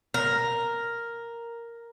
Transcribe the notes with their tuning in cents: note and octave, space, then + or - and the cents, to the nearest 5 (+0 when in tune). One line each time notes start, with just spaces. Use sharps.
A#4 +0 A#5 +0